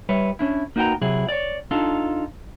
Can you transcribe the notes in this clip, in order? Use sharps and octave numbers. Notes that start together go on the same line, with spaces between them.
G3 B4 C#5 E5
C#4 D4 E4
A#3 D#4 F#4 B4 G5 A#5
C3 F#3 E4 G#4
C#5 D5
D4 D#4 F4 A4